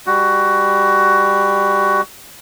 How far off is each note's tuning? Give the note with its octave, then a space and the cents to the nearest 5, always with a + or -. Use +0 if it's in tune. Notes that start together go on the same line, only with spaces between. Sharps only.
G3 +20 F#4 +15